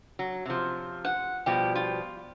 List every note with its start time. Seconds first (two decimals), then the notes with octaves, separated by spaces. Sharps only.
0.19 F#3
0.45 C3 F3
1.05 F#5
1.46 B2 F3 G3 G4
1.75 F4